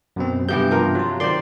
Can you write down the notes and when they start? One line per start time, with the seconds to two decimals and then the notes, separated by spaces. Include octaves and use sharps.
0.16 F#2 B2 C4
0.49 G2 C3 E3 B3 G4 G6
0.71 F3 A#4
0.95 F#3 F4
1.20 D#3 C5 D5 C6